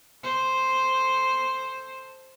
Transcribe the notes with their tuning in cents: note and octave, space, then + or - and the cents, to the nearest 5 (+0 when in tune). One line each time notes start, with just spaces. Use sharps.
A4 +5 C5 +0